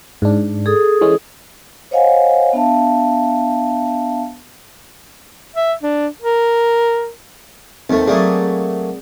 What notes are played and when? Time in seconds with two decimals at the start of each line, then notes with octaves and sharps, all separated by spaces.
0.22 G#2 D4
0.66 G#4 A4 D#6
1.01 E3 G#3 C#4
1.91 C5 C#5 D#5 F5 F#5 G#5
2.53 B3 D4 E5 F5 A5
5.56 E5
5.83 D4
6.21 A#4
7.90 D#2 A3 C4
8.08 F#3 A3 A#3 G#4 D5